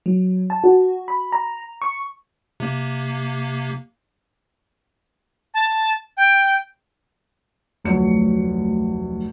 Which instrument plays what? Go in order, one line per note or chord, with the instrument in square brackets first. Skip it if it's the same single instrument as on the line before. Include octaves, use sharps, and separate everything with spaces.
[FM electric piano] F#3
A5
F#4
B5
A#5
C#6
[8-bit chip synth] C3 A#3
[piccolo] A5
G5
[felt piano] F1 D2 F#3 C#7